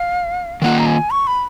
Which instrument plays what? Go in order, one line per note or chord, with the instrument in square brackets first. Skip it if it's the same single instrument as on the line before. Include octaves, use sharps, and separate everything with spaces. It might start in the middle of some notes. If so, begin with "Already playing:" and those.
Already playing: [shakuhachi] F5
[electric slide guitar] D#3 A#3 F4 [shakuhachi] F#5
[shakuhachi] A#5
G#5
C#6
B5